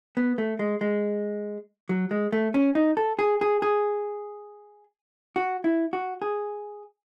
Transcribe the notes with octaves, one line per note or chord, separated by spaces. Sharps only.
B3
A3
G#3
G#3
F#3
G#3
A3
C#4
D#4
A4
G#4
G#4
G#4
F#4
E4
F#4
G#4